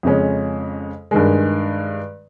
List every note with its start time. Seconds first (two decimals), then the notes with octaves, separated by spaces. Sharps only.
0.03 F2 C#3 G#3 C#4
1.11 G2 D#3 G#3